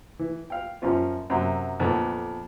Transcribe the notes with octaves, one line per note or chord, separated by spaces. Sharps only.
E3
F5 G5
F#2 F3 C#4 F4
F#2 C3 F#3
F2 A#2 D3 B3